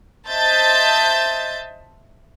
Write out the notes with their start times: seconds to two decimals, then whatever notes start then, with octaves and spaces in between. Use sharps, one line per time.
0.28 C5 D#5 E5 A5 G6 A6